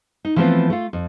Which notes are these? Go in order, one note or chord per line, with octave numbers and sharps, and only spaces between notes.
D#4
E3 F3 A3 B3 C4 F4
A3 F4
F2